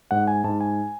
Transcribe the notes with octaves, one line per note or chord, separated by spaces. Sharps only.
G#2 F#5
G#5
G#2 A5
G#5